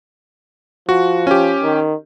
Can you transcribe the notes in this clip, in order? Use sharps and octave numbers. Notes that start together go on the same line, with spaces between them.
F3 F#4
C#4 G4
D#3